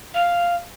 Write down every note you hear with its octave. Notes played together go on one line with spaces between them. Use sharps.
F5